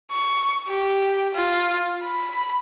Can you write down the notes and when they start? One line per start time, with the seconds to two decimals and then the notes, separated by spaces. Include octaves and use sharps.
0.12 C#6
0.68 G4
1.35 F4
2.04 B5